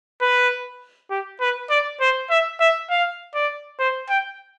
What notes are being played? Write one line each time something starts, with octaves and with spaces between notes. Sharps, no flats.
B4
G4
B4
D5
C5
E5
E5
F5
D5
C5
G5